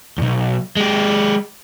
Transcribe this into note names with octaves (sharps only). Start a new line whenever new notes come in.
B1 E2
G#3 G4